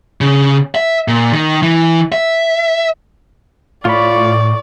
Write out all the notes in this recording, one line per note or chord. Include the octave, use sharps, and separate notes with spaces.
C#3
E5
A#2
D#3
E3
E5
A2 F4 C#5 D5 B5 C#6